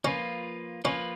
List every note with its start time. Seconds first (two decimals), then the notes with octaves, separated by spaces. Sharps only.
0.05 F3 A#3 C#4 F4 B4
0.84 F3 A#3 C#4 F4 B4